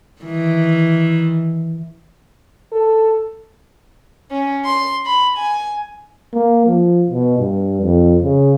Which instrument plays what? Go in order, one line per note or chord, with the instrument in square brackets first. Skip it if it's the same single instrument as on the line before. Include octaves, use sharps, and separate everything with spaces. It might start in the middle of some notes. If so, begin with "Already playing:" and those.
[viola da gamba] D#3 E3
[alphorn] A4
[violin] C#4
C6
B5
G#5
[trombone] A#3
F3
B2
G2
F2
C#3